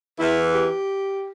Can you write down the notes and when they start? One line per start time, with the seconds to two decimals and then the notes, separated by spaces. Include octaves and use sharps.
0.19 E2 E3 E4
0.54 G4